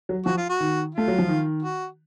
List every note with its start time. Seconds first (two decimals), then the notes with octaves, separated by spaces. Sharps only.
0.09 F#3
0.26 F3 F#4
0.37 F4
0.49 F#4
0.60 D#3
0.95 A3 F4
1.08 F#3
1.18 F3
1.28 D#3
1.62 F#4